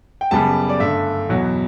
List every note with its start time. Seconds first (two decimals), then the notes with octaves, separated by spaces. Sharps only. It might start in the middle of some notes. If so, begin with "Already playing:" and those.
0.21 G5
0.31 F#2 C#3 G3 B3 A5
0.69 D5
0.80 G2 D3 A3 E5
1.29 E2 B2 F#3